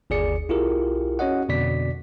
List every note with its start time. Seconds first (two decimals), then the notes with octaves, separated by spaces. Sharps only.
0.10 G1 D#2 G#4 D5 C#7
0.49 B1 E4 F4 G4 G#4 A#4
1.19 C#4 F#4 C#5 D#5 F#5
1.49 F2 B2 D3 D5 B6